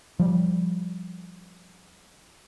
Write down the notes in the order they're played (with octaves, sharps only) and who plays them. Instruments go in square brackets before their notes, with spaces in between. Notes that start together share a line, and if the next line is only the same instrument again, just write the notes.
[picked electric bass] F3 G3